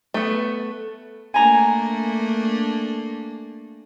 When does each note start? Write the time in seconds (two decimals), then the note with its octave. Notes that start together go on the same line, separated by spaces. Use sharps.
0.14 A3 B3
1.34 A3 A#3 D4 G#5 A#5